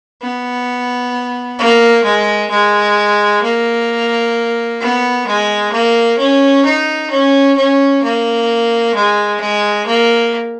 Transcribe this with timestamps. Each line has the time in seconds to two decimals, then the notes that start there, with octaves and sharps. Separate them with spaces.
0.21 B3
1.59 A#3
2.05 G#3
2.50 G#3
3.43 A#3
4.81 B3
5.27 G#3
5.72 A#3
6.18 C#4
6.65 D#4
7.11 C#4
7.56 C#4
8.03 A#3
8.95 G#3
9.40 G#3
9.86 A#3